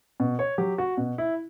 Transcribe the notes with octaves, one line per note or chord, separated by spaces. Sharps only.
B2
C#5
F#3 G4
F#4
B2
E4